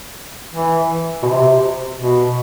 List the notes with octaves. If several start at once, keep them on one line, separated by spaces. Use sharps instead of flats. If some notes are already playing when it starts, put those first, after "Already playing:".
E3
B2
C3
B2